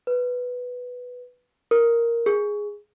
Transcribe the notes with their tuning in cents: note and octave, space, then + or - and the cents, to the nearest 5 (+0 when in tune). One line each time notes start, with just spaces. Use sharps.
B4 +0
A#4 +0
G#4 -5